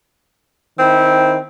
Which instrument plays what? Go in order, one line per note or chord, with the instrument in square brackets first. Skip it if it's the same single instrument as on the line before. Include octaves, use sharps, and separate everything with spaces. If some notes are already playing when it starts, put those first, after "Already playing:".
[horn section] D#3 C4 E4